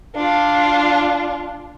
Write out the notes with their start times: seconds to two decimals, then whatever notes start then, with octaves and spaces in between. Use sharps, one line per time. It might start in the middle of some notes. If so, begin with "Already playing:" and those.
0.16 D4 F4